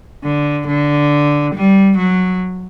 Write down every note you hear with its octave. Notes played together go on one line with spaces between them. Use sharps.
D3
D3
G3
F#3